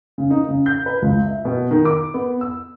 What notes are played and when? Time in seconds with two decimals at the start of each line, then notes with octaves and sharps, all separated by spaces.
0.18 C#3
0.30 D#4
0.49 C#3
0.66 G6
0.86 B4
1.02 C#2
1.26 E5
1.45 B2
1.71 D#3
1.85 D6
2.14 B3
2.41 E6